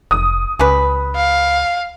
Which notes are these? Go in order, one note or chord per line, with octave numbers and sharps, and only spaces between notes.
F1 D#6
C#2 C#4 G4 B4
F5